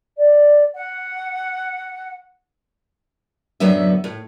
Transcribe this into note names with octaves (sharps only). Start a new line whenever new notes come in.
D5
F#5
F#2 A2 D3 F#3 B3 E5
A2